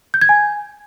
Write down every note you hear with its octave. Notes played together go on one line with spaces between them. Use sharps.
G6
G#6
G#5